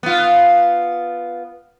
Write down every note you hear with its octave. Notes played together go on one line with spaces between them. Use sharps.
B3 F4